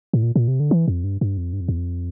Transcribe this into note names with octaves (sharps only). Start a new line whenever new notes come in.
A2
A#2
A#2
C3
D3
E3
F2
G2
G2
F2
G2
F2
E2
F2